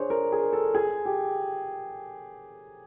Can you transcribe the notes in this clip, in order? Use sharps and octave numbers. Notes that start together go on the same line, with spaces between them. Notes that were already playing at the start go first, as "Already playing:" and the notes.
Already playing: D4 G#4 C5 C#5
A#4
G#4
A4
G#4
G4